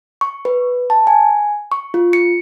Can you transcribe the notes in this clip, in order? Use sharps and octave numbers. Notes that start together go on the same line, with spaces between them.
C#6
B4
A5
G#5
C#6
F4
C#7